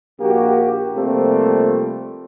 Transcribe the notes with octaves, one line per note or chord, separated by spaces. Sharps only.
A#1 A#3 F#4 G4
C3 F3 G3 A3 A#3 C4